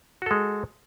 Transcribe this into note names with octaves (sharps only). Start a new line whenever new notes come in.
G#3 F#4 A4